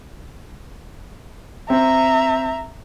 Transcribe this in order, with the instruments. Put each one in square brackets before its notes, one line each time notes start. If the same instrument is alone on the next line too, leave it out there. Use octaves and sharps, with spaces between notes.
[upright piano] C4 [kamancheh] E5 A#5